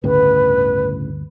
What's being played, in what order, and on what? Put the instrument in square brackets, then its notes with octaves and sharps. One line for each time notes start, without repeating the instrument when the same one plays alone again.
[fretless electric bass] G1 D2 [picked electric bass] A2 C#3 [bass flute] B4